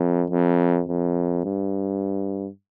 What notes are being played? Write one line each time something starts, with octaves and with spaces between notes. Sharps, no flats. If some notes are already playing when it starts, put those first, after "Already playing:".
Already playing: F2
F2
F2
G2